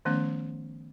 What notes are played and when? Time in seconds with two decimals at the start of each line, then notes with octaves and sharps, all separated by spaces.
0.05 D#3 F3 A3 B3 C#4